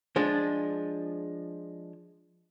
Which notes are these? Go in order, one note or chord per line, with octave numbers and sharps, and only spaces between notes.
F3 G#3 D4